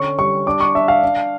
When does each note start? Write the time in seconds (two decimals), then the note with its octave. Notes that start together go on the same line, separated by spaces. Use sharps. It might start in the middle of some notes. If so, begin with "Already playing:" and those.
Already playing: D3 C#4 C#6
0.18 G3 C#6
0.47 D4 D6
0.60 C#6
0.75 D4 E5
0.88 F5
1.02 D4